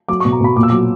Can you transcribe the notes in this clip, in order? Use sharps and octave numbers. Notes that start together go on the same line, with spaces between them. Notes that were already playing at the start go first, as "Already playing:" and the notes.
F#3 D6
B2 C#6
A#5
B2 B5
A#2 D6
E6
F#3 D6